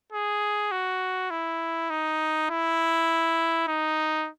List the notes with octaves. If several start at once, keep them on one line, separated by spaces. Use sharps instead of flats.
G#4
F#4
E4
D#4
E4
D#4